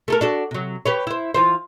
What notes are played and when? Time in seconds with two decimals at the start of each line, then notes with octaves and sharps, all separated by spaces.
0.08 A3 A4 A#4
0.21 D4 F#4 A4
0.51 C3 F#3
0.86 G4 B4 C#5
1.07 E4 C5
1.34 E3 F4 C5